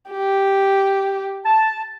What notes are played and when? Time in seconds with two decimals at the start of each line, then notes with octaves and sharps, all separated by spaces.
0.10 G4
1.45 A5